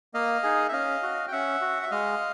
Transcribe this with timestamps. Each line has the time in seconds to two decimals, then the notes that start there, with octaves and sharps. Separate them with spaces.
0.14 A#3 D#5 F5
0.43 D#4 G#4
0.68 E5
0.72 C#4 D#5 F5
1.03 F#4
1.28 G5
1.32 C#4 E5 F#5
1.61 F#4
1.83 E5
1.91 G#3 D#5 F5